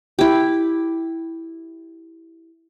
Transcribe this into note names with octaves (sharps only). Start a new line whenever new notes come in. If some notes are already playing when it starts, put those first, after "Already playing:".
E4 G4